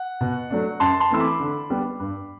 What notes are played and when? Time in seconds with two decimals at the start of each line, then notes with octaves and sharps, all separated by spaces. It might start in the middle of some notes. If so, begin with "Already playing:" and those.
Already playing: F#5
0.21 B2
0.50 F#3 A3 D4
0.80 F#2 A5 C6
1.00 A5 C6
1.10 E3 A3 C4 E4 E6
1.20 B5 D6
1.40 D3
1.70 G3 B3 D4
2.00 G2